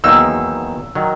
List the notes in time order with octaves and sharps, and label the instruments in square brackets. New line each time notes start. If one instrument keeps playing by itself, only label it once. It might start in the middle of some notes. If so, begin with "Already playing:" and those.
[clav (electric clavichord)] E2 D#3 F#3 A#3 D#4 [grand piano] E6
[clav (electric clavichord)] D#3 F#3